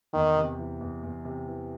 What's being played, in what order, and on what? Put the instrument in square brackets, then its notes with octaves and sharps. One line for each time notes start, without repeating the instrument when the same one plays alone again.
[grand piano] E2 [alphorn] D#3
[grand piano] C3
E3
E2
E2
C3
E3